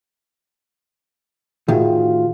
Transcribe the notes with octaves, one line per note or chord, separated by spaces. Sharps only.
A2 D#3 F4 F#4 G#4